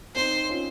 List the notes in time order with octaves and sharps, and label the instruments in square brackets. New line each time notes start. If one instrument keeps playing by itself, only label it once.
[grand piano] C4 D#4 [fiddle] C5
[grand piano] C#4 F4